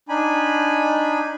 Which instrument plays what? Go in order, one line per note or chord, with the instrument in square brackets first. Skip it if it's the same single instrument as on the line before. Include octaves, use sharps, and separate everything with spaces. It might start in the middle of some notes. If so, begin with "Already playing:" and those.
[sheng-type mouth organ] D4 D#4 G#5 B5